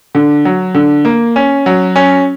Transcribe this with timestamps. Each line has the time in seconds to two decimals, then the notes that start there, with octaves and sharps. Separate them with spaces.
0.15 D3
0.45 F#3
0.74 D3
1.05 A#3
1.36 C#4
1.66 F#3
1.96 C#4